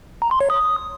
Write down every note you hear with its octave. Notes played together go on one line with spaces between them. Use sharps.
A#5
C6
C#5
D#6